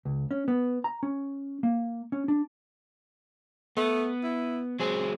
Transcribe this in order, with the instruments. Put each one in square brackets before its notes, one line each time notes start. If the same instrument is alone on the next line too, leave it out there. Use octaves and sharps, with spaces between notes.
[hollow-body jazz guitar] C#2
C#4
B3
A#5
C#4
A#3
C#4
D4
[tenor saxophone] A3 [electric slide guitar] B3
[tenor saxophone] E4
[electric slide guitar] F#3 G#3 G#4 [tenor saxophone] C4